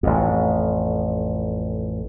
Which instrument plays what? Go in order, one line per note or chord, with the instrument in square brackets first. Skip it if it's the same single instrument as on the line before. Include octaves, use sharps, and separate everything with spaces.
[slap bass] A1 F2